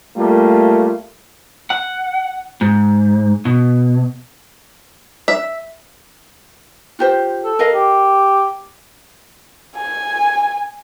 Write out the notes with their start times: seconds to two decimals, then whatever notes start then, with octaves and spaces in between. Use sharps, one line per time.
0.17 G3 A3 A#3 F4
1.70 F#5
2.61 G#2
3.45 B2
5.28 E5
6.99 F4 G4 C5
7.44 A4
7.59 A#4 D#5 F5
7.73 G4
9.76 G#5